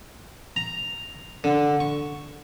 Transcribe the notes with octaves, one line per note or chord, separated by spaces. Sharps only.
A#5
D3
C#6